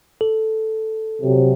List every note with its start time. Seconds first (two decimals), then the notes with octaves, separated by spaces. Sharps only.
0.21 A4
1.22 C3 F#3